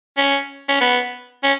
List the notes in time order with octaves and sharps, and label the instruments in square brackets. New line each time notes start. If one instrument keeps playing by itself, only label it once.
[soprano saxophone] C#4
C#4
B3
C#4